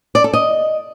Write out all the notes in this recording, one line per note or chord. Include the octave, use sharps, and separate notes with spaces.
D5
A4
D#5